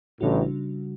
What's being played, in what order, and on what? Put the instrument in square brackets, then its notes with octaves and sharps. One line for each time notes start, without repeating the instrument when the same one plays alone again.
[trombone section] A1 A2 [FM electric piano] C#3 G3 D4 F#4